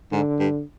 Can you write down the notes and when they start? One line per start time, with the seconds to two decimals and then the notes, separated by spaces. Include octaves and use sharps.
0.12 G#2 D3
0.40 G2